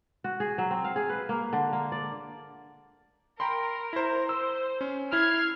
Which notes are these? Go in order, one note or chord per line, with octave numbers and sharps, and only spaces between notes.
F#4
G#4
F#3
C4
F5
G#4
B4
A#3
D3
A#3
D5
A#4 G5 B5 C6
E4 C5
C5 E6
C#4
E4 F6 G#6 C7